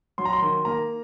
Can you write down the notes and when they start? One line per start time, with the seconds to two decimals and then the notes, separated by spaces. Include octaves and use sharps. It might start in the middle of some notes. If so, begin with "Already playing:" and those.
0.18 F#3 C6
0.25 A#5
0.33 C6
0.42 D#3
0.65 A#3 A#5